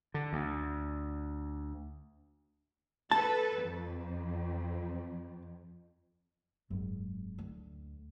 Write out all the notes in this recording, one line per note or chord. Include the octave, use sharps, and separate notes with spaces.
D3
D2
A4 B4 A5
F2
D#1 G#1 F#2 F#3 G#3
D2